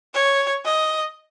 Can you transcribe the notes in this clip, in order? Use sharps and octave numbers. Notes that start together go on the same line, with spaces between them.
C#5
D#5